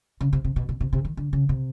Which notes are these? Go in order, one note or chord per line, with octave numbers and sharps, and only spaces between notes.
C#3
C3
C3
B2
B2
C3
C3
D#3
D3
C#3
C3